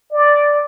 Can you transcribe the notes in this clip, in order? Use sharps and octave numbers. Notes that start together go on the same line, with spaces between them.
D5